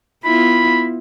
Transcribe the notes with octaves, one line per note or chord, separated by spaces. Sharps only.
B3 E4 F4 B5